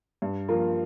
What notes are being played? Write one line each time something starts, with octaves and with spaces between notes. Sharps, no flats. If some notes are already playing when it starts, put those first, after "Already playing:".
G2
F3 A#3 F4 A#4